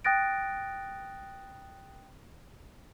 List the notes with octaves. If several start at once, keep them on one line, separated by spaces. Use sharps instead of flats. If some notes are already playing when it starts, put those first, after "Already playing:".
G5 D#6 F#6 A6 A#6 D7